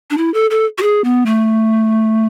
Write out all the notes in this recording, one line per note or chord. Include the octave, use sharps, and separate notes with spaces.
D4
E4
A4
A4
F#4
G#4
B3
A3